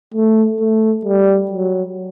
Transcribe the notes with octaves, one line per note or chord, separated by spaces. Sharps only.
A3
A3
G3
F#3